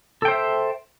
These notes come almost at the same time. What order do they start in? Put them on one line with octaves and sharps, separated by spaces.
A4 G5 C5 E5